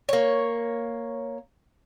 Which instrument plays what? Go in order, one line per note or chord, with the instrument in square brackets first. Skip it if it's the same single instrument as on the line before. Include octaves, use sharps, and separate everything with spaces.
[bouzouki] A#3 C#5